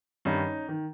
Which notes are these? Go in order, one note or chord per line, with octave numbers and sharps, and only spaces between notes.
G2 D#3 C#4 D#4
D#3